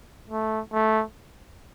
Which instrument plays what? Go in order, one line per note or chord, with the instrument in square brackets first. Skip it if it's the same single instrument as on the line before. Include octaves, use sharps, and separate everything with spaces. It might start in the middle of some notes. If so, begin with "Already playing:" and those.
[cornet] A3
A3